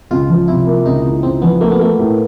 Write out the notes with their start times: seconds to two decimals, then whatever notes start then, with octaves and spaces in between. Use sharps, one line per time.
0.11 C#2 F4
0.29 F3
0.48 C3 E4
0.67 A#3
0.86 C#2 D#4
1.04 C#2
1.23 C#2 C4
1.42 F3 B3
1.61 A3 A#3
1.71 B3
1.80 A3 A#3
1.98 A2